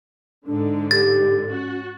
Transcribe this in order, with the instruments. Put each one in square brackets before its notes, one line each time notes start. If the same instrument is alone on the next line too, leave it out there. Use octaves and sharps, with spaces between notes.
[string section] G#2 D3 [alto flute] D4
[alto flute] G4 [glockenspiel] A6
[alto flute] C#4 [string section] F#4